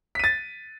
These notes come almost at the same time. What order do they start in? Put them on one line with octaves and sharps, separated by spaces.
B6 D#7 A6